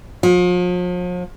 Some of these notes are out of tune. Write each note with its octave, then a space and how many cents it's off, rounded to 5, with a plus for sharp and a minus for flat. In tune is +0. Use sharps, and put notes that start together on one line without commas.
F3 +40